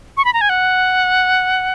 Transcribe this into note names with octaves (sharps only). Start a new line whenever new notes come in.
C#6
B5
A#5
G#5
F#5